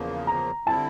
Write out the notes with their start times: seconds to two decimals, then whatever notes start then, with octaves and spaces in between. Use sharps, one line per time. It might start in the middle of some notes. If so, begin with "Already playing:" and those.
Already playing: E2 C#3 F3 A#3
0.27 A#5
0.67 D3 G3 C4 E4 A5